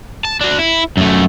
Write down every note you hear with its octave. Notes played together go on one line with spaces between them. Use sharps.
A5
D4 F#4
E4
F#2 A3